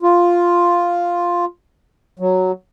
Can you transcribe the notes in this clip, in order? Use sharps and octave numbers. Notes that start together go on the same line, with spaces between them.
F4
F#3